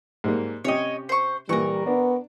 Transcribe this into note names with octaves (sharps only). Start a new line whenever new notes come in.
G#2 G3 A#3
C3 C#4 G4 C#5 D#5
C5 C#6
A#2 E3 G3 A#4 C#6
B3 D4